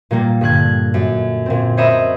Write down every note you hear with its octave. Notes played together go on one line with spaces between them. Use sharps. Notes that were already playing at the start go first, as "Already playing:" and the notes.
A#2 G3 A#3
G2 D3 F#6 G#6
F#2
A#2 C4
C5 C#5 D#5 E5 A#5 B5